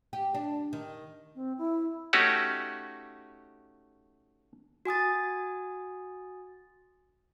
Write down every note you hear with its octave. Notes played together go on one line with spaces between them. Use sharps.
G4
D4
D#3
C4
E4
A3 C#4 D#4 F#4 G4
F#4 G#5 D#6 A6